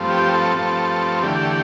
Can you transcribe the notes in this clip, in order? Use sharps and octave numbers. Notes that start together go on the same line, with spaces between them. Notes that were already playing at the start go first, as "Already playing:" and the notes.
Already playing: G2 F3 A3 C4
G4
A4
G2 F3 A3 C4
E2 D3 A3 G4